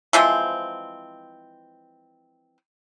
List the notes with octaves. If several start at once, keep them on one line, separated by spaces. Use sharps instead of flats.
E3 F3 G#3 C4